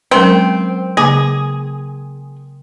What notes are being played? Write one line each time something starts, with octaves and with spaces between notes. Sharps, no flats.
F#3 G#3 C4 C#4 A#4 G5 C6
C#3 A#3 G#4